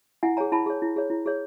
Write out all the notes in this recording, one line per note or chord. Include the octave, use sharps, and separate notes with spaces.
E4 F#5 G#5
G#4 C#5 G#5 A#5
E4 A5 B5
G#4 C#5
E4
G#4 C#5
E4
G#4 C#5